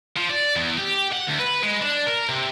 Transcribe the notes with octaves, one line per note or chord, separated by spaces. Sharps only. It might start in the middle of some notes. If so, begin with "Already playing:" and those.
F3
D5
E2
G4
F#5
D2
B4
G#3
D4
A#4
C3